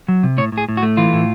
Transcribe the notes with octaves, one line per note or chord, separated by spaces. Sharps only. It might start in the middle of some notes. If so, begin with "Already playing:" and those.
F#3
C3
A2 C#5
A2
G#4
A2
F#4
A3
E3 F4
A2